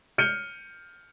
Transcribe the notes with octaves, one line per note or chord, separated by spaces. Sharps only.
F6 G6 C#7 D#7 G7